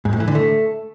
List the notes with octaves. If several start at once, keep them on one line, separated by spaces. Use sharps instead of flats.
G#2
A2
E3
D3
A3